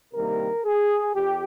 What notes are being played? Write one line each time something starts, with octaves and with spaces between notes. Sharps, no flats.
C2 C3 D#3 G3 A#3 A#4
G#4
F2 G4